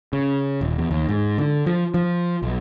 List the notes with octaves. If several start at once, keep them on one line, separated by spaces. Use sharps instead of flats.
C#3
D#1
E2
D#2
G#2
D3
F3
F3
B1